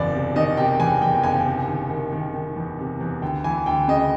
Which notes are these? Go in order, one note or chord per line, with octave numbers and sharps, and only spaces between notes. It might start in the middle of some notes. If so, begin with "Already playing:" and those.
Already playing: F#1 E2 D5
C3
D#3 D#5
C3 G5
E2 G#5
E2 G5
F#1 G#5
C3
D#3
D#3
D#3
D#3
E2
C3
E2
D2 G5
E3 G#5
D2 G5
C#3 D#5